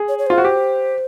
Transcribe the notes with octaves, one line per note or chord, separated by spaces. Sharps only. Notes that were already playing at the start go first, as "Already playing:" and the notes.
Already playing: G#4
C#5
C#5
F4 C5
F#4
G4